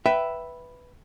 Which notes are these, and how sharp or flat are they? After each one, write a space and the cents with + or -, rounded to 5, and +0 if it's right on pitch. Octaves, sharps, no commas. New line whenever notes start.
B4 +0 E5 +0 G5 -25